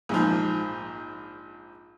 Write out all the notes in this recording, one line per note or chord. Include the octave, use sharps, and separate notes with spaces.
A#1 G#2 F3